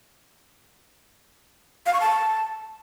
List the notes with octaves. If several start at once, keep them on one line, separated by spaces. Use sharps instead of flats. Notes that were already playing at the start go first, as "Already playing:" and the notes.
F5
C#6
A5